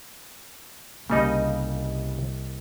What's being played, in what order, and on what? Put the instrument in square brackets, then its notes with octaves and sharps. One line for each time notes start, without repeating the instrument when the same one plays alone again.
[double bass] C2 [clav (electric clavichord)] C#3 G3 D#4 [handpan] A#3 D#5